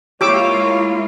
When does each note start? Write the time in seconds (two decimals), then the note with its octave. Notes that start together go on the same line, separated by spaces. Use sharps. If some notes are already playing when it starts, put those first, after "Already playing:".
0.21 G#3 A#3 E4 F4 G4 C#5 D6 E6